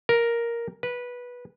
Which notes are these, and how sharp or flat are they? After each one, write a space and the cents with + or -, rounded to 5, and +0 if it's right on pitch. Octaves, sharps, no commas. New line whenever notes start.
A#4 +5
B4 -15